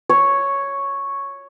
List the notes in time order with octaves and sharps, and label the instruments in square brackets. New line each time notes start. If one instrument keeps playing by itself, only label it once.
[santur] C#5